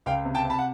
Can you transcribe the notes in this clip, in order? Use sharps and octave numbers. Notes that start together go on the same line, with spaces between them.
C#2 F5 G5
C3
G5 A5
C3 A5 B5
F#5